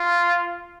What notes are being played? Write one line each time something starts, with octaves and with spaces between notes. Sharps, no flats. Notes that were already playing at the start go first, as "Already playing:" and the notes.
Already playing: F4